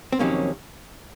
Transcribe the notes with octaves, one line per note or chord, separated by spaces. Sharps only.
C4
F2 C3 D#3 F#3 A#3 C#4